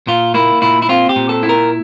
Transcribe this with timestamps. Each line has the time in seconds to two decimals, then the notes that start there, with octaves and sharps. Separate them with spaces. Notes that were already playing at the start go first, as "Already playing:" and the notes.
0.07 A#2 F4
0.34 A#3 E4
0.62 A#2 E4
0.82 E4
0.89 C4 F4
1.09 G4
1.16 A#2
1.29 A4
1.43 E4
1.49 A#4